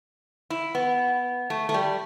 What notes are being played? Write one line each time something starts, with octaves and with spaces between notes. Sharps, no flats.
E4
B3
A3
A3
G3